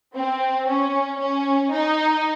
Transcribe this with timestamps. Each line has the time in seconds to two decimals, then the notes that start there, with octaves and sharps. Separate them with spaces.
0.15 C4
0.67 C#4
1.19 C#4
1.72 D#4